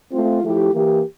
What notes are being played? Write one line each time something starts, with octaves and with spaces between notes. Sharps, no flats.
A3 C4 F4
F3 A3 E4 G4
E3 A#3 E4 G4